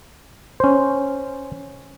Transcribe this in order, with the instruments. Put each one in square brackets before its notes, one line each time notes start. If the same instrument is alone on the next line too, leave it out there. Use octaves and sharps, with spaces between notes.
[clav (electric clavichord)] C#4 C5